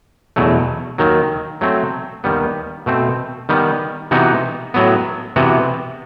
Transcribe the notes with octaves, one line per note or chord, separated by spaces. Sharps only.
E2 B2 F#3 A3
D#2 D#3 F#3
F#3 A3 C4
D#2 D#3 G3 B3
B2 A3 C4
D#3 G3 B3
C3 E3 B3 D#4 F#4
A2 F#3 B3
C3 E3 B3 F#4